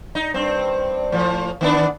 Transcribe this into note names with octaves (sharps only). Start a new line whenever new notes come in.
D#4
G2 C4
A2 F3
D#3 B3 D4